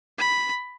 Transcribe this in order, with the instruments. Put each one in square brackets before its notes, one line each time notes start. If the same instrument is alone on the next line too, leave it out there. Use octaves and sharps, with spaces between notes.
[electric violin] B5